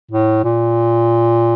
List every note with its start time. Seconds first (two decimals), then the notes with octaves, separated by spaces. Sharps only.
0.11 A2
0.44 A#2